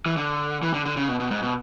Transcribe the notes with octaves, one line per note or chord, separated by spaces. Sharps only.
E3
D3
E3
D3
D3
C#3
B2
B2
G#2
B2